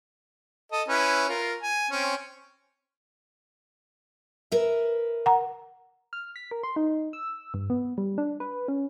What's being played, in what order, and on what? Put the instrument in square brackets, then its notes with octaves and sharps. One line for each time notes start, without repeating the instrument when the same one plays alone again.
[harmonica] A4 D#5
C#4 E4 B4
F4 A#4
G#5
C4 C#4
[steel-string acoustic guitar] A#4 B4 E5
[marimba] F#5 A#5
[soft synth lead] F6
B6
A#4
C6
D#4
E6
G2
B3
G3
D4
B4
C#4